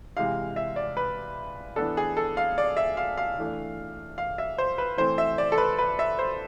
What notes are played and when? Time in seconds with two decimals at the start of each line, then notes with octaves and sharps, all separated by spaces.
0.17 C3 E3 G#3 F5
0.56 E5
0.76 D5
0.97 B4
1.76 E3 B3 D4 A4
1.97 G#4
2.17 A4
2.37 F5
2.58 D5
2.77 E5
2.97 F5
3.17 F5
3.38 E3 A3 D4
4.18 F5
4.38 E5
4.58 C5
4.78 B4
4.97 E3 A3 C4 C5
5.18 E5
5.38 D5
5.52 A4
5.58 B4
5.79 B4
5.99 E5
6.19 C5